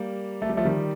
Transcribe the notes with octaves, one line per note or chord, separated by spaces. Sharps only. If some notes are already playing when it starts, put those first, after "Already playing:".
Already playing: G3 A#3
A3
G3
F3 A3
D#3 G3